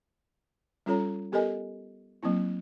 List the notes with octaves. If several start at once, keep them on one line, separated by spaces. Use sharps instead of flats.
G3 C#4 F4 A4 C#5 A#5
B3 G4 A4 A#4 D#5 G#5
F#3 A#3 C4 E4